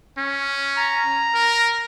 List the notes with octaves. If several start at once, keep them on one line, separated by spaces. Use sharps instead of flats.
C#4
A#5
A#4